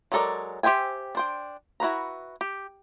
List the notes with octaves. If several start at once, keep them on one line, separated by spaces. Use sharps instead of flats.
F#3 G#3 A4 A#4 D5
G4 C5 E5 G5 G#5
D4 C5 G5
E4 F#4 B4 A#5
G4